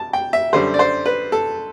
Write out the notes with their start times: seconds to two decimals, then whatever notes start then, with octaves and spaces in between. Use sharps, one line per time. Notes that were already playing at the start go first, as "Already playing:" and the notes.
Already playing: A5
0.13 G5
0.33 E5
0.53 F#2 D3 G3 C5
0.74 D5
0.79 C5
1.05 B4
1.32 A4